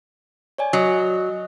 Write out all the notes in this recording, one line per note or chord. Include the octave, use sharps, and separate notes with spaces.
C#5 D5 G#5
F#3 D#5 D#6